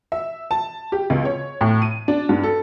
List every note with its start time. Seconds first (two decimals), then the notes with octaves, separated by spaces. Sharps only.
0.12 E5
0.51 A5
0.92 G4
1.10 C#2
1.25 C#5
1.61 A2
1.82 D#7
2.08 D4
2.29 G2
2.43 A4